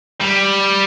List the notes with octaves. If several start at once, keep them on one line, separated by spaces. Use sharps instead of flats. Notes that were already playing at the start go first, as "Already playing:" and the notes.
G3